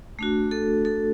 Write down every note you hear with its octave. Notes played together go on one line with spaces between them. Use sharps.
A3 D4 F#4
A4
A4